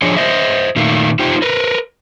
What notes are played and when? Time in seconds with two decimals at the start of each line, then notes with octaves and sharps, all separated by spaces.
0.02 F3 D4 G#4 C#5 D#5 G#5
0.17 C5 D#5 E5
0.76 A#2 D#3 A3 A#3
1.19 A3 D#4 F4 G4 C5 G5
1.42 A#4 B4